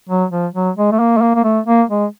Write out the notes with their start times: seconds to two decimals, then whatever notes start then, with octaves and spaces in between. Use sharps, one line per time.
0.09 F#3
0.31 F3
0.54 F#3
0.77 G#3
0.92 A3
1.00 A#3
1.17 A3
1.22 A#3
1.35 A#3
1.44 A3
1.67 A#3
1.90 G#3